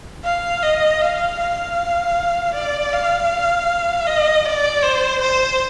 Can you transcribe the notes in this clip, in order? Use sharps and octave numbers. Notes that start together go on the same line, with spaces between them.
F5
D#5
F5
F5
D5
F5
D#5
D5
C5
C5